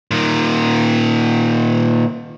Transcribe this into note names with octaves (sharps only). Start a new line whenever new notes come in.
A#2 D#3